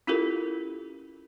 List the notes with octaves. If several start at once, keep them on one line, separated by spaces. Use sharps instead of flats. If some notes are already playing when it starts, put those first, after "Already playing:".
C#4 E4 F4 G4 A4 A#4